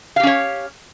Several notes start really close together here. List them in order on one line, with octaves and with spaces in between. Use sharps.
F5 G4 C#4 C#5